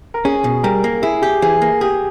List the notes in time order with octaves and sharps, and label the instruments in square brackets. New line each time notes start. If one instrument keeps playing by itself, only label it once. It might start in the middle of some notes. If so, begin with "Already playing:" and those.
[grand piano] A#4
[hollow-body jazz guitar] C#4 [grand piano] G#4
[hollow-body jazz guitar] B2
[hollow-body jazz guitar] G3 [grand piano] A#4
[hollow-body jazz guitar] A#3
[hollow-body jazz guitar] E4 [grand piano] G#4
[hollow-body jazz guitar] G4 [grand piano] G#4
[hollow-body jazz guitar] E3 [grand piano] G#4
[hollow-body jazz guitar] A#3
[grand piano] G4 [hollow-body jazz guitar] G#4